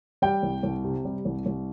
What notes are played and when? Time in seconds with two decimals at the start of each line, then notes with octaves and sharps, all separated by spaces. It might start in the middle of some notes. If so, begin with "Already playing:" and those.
0.22 G3 G5
0.43 C2
0.63 C2
0.84 C3
1.05 G3
1.25 C2
1.46 C2